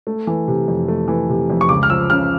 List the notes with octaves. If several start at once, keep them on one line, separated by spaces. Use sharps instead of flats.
A3
E3
C3
F2
A3
E3
C3
F2
C#6
C#2 D6
F6
F3 E6
C#3 F6